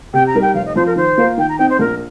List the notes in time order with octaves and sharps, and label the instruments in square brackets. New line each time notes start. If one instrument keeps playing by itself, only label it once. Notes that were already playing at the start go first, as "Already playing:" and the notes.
[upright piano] C3 [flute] G5
[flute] A#5
[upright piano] G3 D#4 A#4
[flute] G5
[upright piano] F1 [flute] F5
[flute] D#5
[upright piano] F2 F3 [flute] C5
[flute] A#4
[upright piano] D#3 [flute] C5
[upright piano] A#3 F4 A#4
[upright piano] D#3 [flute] G5
[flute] A#5
[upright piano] C4 D#4 [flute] G5
[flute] C5
[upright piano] A#1 [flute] A#4